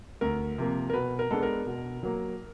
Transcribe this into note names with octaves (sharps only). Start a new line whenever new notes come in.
D2 A#4
C3 F3 A#3
A#4
B2 B4
A#4
G#3 B3 D4 A4
A#4
B2
F#3 A#3